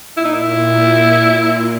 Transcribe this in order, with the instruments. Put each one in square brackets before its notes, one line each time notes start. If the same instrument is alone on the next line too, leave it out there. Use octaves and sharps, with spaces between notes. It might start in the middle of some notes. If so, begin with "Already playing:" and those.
[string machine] A#2 [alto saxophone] E4
[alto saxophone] D#4
E4